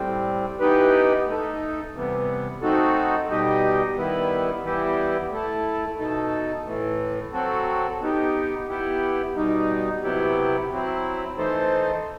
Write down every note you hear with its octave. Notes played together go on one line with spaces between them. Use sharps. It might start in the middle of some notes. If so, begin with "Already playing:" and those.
Already playing: A2 G3 C4
E3 B3 D#4 G4 B4
A3 D#4 A4
C3 E3 G3 B3
A3 C4 D#4 F#4 A4
B2 G3 D#4 G4 D#5
D#3 G3 B3 E4 B4
E3 G3 B3 E4 G4
A3 E4 A4
B2 A3 D#4 A4
A2 E3 A3
F#3 C4 F#4 A4
B3 D#4 G4
B3 E4 G4
B2 G3 D#4
C3 F#3 B3 E4 G4
F#3 C4 E4
E3 A3 D#4 A4 C5